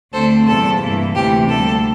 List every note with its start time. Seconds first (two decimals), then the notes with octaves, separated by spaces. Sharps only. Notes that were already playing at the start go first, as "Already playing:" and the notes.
0.13 D2 D3 A3 C4 A4 C5
0.47 E2 C3 G3 A#3 A4
0.81 G2 E3 A#3
1.15 D2 C3 E3 G4
1.49 D2 D3 G3 A#3 A4